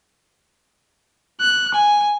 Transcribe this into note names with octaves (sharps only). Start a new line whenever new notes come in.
F#6
G#5